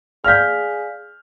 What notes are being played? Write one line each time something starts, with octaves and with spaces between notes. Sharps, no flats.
G#4 D5 F5 F6 G6 B6